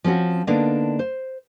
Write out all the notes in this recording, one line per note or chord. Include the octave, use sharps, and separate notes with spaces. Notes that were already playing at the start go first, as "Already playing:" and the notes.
F3 C4 C#4 F#4
D3 A#3 B3 D4 D#4
C5